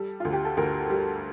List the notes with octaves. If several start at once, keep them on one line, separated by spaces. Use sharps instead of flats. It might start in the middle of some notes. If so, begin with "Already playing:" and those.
Already playing: G3 A4
D2 F4
G4
A4
D2 A#4
G3